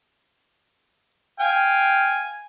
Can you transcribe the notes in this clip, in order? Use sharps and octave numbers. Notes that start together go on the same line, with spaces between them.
F5 G5 G#5